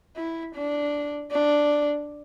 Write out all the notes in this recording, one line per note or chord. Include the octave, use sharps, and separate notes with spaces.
E4
D4
D4